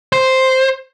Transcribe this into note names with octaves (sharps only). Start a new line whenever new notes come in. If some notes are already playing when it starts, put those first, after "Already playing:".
C5